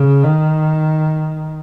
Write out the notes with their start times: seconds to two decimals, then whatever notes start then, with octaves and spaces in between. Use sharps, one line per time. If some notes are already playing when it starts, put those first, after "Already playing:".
Already playing: C#3
0.24 D#3